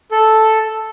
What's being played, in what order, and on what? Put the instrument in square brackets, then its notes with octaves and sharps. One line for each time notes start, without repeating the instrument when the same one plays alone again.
[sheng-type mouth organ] A4